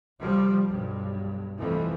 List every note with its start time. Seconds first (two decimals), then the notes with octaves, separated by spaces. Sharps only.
0.19 C2 F3 G3
0.67 B1 G2
1.59 C2 F2 E3 F3 A3